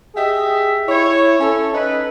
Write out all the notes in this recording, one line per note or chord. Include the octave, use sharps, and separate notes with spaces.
G4 G#4 D#5 E5
E4 C#5
C#4 A4
D#4 B4